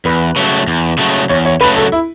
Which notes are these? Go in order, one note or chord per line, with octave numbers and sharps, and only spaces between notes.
E2 B4
C#3 F#3 A3
E2
C#3 F#3 A3
E2 C#5
C#5
C#3 F#3 A3 B4
A4
E4